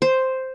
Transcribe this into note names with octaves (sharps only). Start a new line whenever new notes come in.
C5